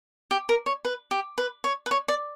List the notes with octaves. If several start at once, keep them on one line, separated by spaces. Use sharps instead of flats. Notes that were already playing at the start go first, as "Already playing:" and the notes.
G4
A#4
C#5
B4
G4
B4
C#5
B4
C#5
D5